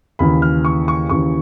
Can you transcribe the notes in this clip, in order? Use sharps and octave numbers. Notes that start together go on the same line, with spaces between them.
D#2 C#3 E3 B5
F6
C#6
C#6
D#2 C#3 E3 C#6